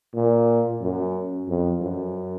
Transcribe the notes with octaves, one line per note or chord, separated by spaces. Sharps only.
A#2
F#2
F2
F#2